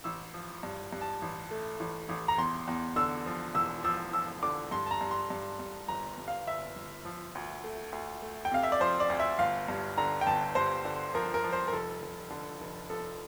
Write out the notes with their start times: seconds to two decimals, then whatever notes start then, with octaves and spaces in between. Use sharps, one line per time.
0.04 A1 E6
0.34 F3
0.63 G2
0.93 G2
1.01 A5
1.22 A1
1.51 A3
1.80 A1
2.09 A1
2.28 A#5
2.38 E2 C6
2.67 E2
2.96 D3 E6
3.26 F3
3.55 E1 E6
3.84 F3 E6
4.13 F3 E6
4.43 D3 D6
4.71 G2 C6
4.86 A5
4.91 A#5
5.01 G2
5.11 C6
5.30 G2
5.59 G2
5.88 G1 A#5
6.18 G2
6.28 F5
6.47 G1 E5
6.76 G1
7.05 F3
7.35 D2
7.64 A3
7.92 D2
8.22 A3
8.45 G5
8.52 C3 F5
8.63 E5
8.72 D5
8.80 F3 C5
9.00 D5
9.10 D2
9.20 E5
9.39 G1 F5
9.68 G2
9.98 D3 A#5
10.21 G5
10.26 G1 A5
10.55 G2 C5
10.85 D3
11.14 F3 A#4
11.34 A#4
11.44 F3
11.53 C5
11.68 A#4
11.73 F1 A4
12.02 F1
12.30 D3
12.61 F1
12.90 F3 A4